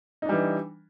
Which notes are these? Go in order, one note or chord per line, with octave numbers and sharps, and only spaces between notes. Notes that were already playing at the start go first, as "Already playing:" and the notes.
E3 G3 D4 D#4